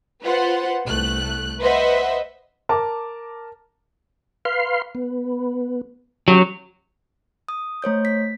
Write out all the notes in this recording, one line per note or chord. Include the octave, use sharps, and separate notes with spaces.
F4 B4 C5 F#5
C2 A3 F#6
B4 C5 D#5 E5 F#5
A#4 A5 D6
B4 F5 C6
B3
F#3 C#4 G4
D#6
A3 C5 C#5 G6
B6